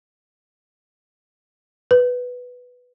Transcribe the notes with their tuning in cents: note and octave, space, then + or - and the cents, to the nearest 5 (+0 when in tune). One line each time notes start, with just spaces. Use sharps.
B4 +0